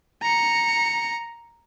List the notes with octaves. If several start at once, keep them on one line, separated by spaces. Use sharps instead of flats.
A#5 C#7